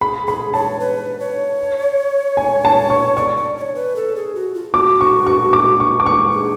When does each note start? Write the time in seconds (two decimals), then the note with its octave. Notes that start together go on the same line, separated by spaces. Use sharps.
0.01 G#4 B5
0.27 G#4 B5
0.53 C#5 A5
0.80 B4
1.20 C#5
2.37 G#5
2.65 A5
2.90 C#6
3.17 D5 C#6
3.36 D5
3.57 D5
3.62 C#5
3.75 B4
3.96 A4
4.16 G#4
4.35 F#4
4.55 F4
4.74 F#4 D6
5.01 C#6
5.26 C#6
5.53 D6
5.80 C#6
6.00 D6
6.06 C#6
6.32 G#4